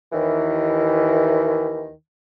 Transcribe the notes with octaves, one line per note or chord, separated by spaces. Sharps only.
D#2 D#3 E3